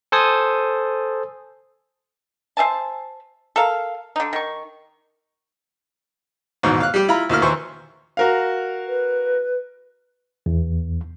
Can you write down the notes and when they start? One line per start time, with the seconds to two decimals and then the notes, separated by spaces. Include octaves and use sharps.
0.12 A4 C5 G#5 D#6
2.57 C5 E5 G#5 A5
3.56 A4 A#4 F5
4.16 D3 D#4
4.33 D#3 C#6
6.63 A1 D#2 G#2 B2
6.80 F5 F#6
6.94 G3 G4
7.08 E4 F4 A#5 B5
7.29 D2 A#3 E4 F6
7.42 D#2 E3 C5 C#6
8.17 F#4 A#4 F5
8.88 B4
10.46 E2